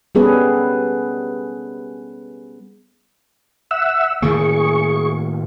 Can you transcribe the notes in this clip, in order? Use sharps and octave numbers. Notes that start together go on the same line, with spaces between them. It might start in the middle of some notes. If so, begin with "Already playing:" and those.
G3 B3 C#4 G#4 A4 B4
E5 F#5 E6
A2 D#3 A#3 G#4 C#6